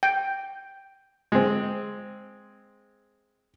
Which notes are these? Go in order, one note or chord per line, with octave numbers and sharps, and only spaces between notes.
G5
G#3 C4